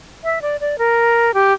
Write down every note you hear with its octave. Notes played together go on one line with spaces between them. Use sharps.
E5
D5
D5
A#4
G4